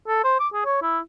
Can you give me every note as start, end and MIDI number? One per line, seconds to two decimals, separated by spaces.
0.08 0.20 69
0.24 0.36 72
0.40 0.48 86
0.53 0.64 68
0.65 0.79 73
0.82 0.99 64